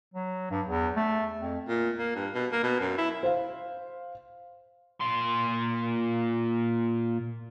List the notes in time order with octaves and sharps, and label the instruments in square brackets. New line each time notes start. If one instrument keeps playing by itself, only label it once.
[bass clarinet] F#3
G2
E2
A3
F2
[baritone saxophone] A#2
A#3
G2
B2
A#3
B2
F#2
E4
[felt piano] C5 F5
[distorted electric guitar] A#2 C6